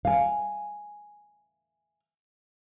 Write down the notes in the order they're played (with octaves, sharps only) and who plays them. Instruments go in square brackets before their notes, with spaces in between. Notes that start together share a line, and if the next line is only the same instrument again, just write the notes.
[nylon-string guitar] F5 G#5